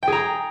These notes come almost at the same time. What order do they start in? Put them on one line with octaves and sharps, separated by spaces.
G5 G#4 A#5